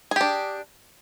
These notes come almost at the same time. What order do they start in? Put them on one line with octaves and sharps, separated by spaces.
G#4 G4 D4